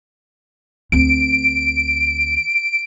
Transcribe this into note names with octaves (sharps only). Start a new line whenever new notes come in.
D2 C4 D7